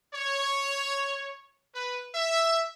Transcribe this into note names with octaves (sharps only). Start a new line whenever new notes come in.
C#5
B4
E5